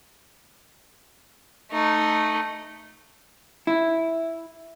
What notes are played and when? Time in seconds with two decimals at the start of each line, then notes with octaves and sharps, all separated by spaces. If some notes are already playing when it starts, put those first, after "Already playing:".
1.71 A3 D#4
3.67 E4